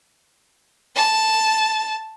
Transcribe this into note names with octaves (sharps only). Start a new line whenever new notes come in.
A5